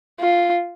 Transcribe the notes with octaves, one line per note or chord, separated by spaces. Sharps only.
F4